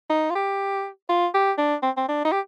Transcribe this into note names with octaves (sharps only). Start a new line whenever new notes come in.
D#4
F4
G4
F4
G4
D4
C4
C4
D4
D#4
G4